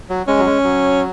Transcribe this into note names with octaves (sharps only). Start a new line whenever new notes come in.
F#3
G#3 C#4
F#3
G#3
F#3